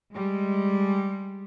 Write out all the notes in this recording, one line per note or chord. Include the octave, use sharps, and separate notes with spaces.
G3 G#3